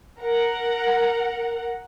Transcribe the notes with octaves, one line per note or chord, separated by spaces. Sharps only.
A#4 F#5